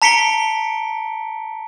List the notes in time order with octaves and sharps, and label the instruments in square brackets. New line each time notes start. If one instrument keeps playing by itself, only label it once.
[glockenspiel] A5 A#5 B6 C#7 D7 G7